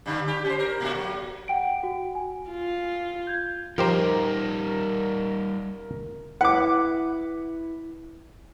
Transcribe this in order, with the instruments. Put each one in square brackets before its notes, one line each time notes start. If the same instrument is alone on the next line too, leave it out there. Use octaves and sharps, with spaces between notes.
[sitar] G2 D3
G4
C#4 C5
A#4
A#2 A3 F#4
F#3
[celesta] F#5 G5 D7
F#4
G#5
[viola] F4
[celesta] G6 G#6
[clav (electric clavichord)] F3 G4 C5 [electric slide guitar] G3 D#4 [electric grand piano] A#4 A#5
[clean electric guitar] E4 B4 [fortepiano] F#5 D6